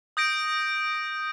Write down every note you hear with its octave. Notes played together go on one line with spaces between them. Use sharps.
D#6 G6 A#6 D7